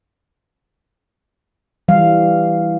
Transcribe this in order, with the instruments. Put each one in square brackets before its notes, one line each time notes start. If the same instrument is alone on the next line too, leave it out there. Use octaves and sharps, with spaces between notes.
[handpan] E3 G3 F5